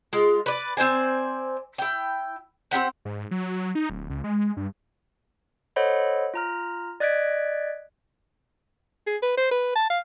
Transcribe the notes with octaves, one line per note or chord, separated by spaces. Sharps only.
G#3 F4
B4 D5
C4 C5 D5 G#5
E4 G5
C4 E4 G4 F#5
G#2
F#3
D#4
D1
C#2
G#3
G2
A4 C5 C#5 D#5 F#5 B5
F4 A#5 F6
D5 D#5 F#6 G#6 B6 D7
G#4
B4
C5
B4
A5
F5